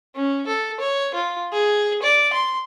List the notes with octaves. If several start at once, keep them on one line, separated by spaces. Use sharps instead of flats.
C#4
A4
C#5
F4
G#4
D5
C6